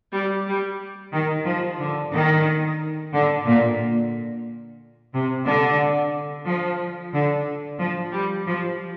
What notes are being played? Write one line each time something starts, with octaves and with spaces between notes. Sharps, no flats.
G3
G3
D#3
F3
D3
D#3
D3
A#2
C3
D3
F3
D3
F3
G3
F3